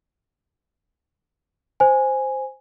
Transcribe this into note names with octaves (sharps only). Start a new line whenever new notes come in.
C5 G#5